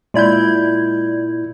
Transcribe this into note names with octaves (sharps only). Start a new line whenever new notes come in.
A#2 G#3 E4 D5 G6 G#6